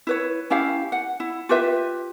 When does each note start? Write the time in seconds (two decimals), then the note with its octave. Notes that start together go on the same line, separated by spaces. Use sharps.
0.07 E4 B4 C#5
0.50 C#4 E4 G4 F5
0.92 F#5
1.20 E4
1.49 F4 G4 B4 E5